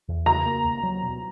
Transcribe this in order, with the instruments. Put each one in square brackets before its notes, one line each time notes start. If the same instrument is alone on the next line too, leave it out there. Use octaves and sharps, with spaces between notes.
[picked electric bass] E2
[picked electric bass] C#3 [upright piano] A#5
[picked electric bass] A#3
D#2
F#3
B2